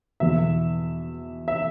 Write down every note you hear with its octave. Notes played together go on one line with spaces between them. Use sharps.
E2 B2 E5
E5